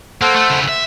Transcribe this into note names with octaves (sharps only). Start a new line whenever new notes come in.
A#3 A4 C5 F#5
A3
C#3 E4
E5